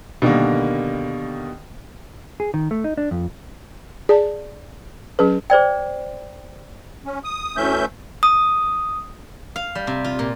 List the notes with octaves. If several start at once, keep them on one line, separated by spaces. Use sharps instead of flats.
B2 D3 D#3 G3 A#3
G#4
D#3
A3
D#4
D4
F2
G#4 D5 A5
F#3 C#4 G#4 B4
G#4 C5 D5 G5
C#4
D#6
D2 E3 A3 C#4 E5 G6
D#6
F5
G3
C3
F4
A#2